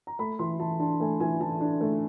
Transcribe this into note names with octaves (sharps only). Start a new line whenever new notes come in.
A#5
A3 B5
E3 C6
E3 A5
D4 A5
A3 G#5
E3 G#5
E3 A5
D4
A3